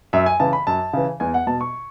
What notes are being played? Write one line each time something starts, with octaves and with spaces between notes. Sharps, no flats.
F#2 E5
G#5
C#3 E3 A5
B5
F#2 A5
C#3 E3
E2 G#5
F#5
B2 A5
C#6